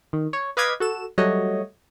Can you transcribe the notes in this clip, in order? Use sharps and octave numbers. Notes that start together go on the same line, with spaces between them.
D#3
C#5
B4 D#5 F5 D6 G#6 B6
F#4 A4 E7
F#3 G3 A3 F#4 C#5 D#5